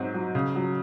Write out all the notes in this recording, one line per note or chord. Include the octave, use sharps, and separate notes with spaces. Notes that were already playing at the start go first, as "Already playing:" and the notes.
Already playing: G#2 F#3 C4
F#3
C#3
F#3